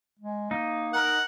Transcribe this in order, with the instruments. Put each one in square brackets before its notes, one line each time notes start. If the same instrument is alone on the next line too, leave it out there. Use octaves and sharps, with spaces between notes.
[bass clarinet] G#3
[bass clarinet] A#3 [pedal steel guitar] D#4
[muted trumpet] A#4 [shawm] F#5